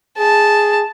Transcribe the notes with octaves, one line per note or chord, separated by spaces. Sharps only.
G#4 A5